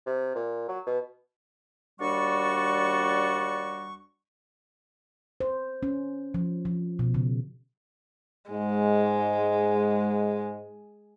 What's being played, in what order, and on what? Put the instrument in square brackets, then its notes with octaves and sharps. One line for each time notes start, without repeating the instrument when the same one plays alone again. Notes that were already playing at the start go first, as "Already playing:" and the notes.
[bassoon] C3
A#2
F#3
B2
[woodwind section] D#2 G3 D4 F#4 D5 C#6
[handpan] C5
C#4
F3
F3
B2
C#3
[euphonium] G#2 [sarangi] G#3